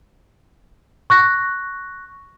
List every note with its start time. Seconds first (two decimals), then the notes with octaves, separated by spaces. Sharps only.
1.10 C#6 F#6 A#6